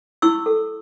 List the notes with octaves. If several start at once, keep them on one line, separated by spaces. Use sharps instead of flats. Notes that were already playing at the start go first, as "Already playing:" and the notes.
E4 C#6 E6
A4